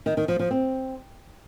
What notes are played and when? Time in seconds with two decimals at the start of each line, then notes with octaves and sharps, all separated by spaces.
0.06 D#3
0.17 D#3
0.28 F3
0.39 F3
0.51 C4